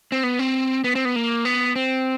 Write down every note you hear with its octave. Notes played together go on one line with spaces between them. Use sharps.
C4
B3
C4
B3
C4
B3
A#3
B3
C4